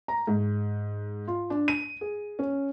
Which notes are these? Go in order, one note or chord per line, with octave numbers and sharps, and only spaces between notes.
A#5
G#2
F4
D4
D#7
G#4
C#4